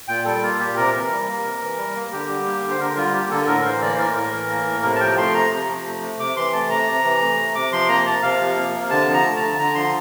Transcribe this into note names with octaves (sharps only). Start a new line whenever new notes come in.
A#2 G5
G3 A4
A#3 F4
A#2 G4
C3 A#4
E3
G3
A#3
C3
E3
G3
A#3
D3 G4
G3
A#3
D3
C5
D3 A#4
G3 F4
A#3 G4
D3 A4
A2 A#4
E3 C5
A#3 D5
C5
A2 A#4
A2 A#4
E3
A#3
A2
C3 A#4
A5
F3 G5
A3 C6
C3 A#5
C3
F3
A3
C3
C3 D6
E3 C6
A3 A5
C3 A#5
C3
E3
A3
C3
C3 D6
F3 C6
A#3 A#5
C3 A5
C3 F5
F3
A#3
C3
D3 A5
F3
A#5
A3
D3 A5
D3 A#5
F3 C6